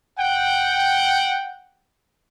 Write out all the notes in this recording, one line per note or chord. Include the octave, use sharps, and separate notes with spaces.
F#5 G5